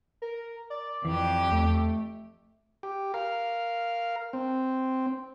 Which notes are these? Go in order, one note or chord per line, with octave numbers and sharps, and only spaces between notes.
A#4
D5
F2 E3 G4
E2 A3
G4
A#4 F5
C4